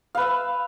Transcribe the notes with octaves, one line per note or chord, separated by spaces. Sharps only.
B4 E5 F5